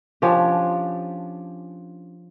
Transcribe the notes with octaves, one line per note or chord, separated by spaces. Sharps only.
F3 C#4 D4 G4